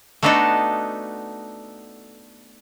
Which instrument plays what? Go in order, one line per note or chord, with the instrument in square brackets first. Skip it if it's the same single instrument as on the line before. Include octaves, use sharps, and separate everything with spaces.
[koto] A3 B3 D4 D#4 F#4 A4